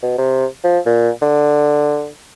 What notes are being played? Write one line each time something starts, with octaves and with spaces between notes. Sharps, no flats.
B2
C3
F3
A#2
D3